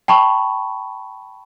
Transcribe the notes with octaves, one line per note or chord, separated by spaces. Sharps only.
G5 A5 B5 C#6